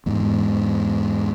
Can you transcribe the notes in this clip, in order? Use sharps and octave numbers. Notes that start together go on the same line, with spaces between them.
E2 G#2